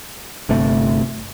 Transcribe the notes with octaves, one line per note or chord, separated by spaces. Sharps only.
G1 C3 A3